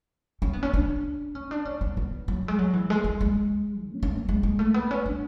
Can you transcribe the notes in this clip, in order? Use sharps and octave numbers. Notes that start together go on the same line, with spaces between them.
C#4
B3
C#4
D4
C#4
D4
C#4
B3
B3
F#3
G#3
F#3
E3
G#3
G#3
G#3
D3
C#4
C#4
F#3
G#3
G#3
A3
B3
C#4
D4